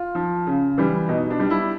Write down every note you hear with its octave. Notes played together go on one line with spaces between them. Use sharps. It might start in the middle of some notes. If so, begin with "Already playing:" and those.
Already playing: F4
F3
C#3
E3 G3
B2 D#4
D4
G3
E4